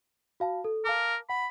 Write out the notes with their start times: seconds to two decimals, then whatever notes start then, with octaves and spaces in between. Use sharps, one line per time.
0.40 F#4 F5 A5
0.64 A4
0.85 A#4 F5 A5 D6
1.29 F#5 B5